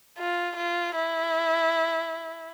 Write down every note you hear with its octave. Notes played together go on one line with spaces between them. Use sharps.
F4
F4
E4